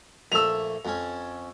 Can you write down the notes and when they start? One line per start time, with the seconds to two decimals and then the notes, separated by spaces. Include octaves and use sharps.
0.32 A#1 A3 E6 F7
0.85 F2 C#4